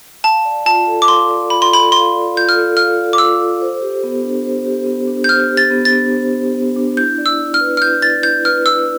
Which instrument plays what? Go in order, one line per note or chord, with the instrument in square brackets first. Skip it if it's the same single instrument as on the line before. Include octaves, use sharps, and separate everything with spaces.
[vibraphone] F5 [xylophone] A5
[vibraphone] D5
[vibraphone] F4 [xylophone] A5
[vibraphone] A4
[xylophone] D6
[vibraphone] F5 [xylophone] C6
[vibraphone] D5
[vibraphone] F4 [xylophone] B5
[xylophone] C6
[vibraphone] A4 [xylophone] B5
[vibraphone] F5 [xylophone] C6
[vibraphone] D5
[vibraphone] F4 [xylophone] G6
[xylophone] F6
[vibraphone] A4
[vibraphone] F5 [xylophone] F6
[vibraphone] D5
[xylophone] D6
[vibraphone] F4 [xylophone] E6
[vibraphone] A4
C5
G4
B3
D4
C5
G4
B3
D4
[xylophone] G6
[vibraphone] C5 [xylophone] F6
[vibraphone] G4
[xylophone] A6
[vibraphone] B3
[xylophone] A6
[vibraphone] D4
C5
G4
B3
D4
[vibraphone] E4 [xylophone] G6
[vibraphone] D5
[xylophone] E6
[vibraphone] E4
[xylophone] F6
[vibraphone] B4
[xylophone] F6
[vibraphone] E4 [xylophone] G6
[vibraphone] D5 [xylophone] A6
[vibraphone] E4 [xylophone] G6
[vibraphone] B4 [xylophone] F6
[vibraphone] E4 [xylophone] E6